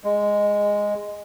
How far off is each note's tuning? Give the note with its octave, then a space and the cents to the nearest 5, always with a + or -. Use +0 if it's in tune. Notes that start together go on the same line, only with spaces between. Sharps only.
G#3 -10